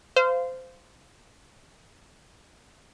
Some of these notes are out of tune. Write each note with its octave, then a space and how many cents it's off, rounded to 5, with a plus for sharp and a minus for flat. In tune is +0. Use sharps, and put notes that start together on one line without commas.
C5 -20 F5 -10